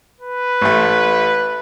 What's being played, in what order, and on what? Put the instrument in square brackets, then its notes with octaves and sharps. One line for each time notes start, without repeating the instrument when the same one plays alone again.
[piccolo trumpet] B4
[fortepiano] A1 A3